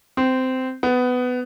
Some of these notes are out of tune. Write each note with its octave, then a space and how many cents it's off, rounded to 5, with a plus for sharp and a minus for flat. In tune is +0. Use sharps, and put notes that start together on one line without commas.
C4 -15
B3 +15